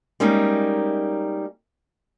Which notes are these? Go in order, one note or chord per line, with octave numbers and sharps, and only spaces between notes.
G3 G#3 A#3 C#4 D#4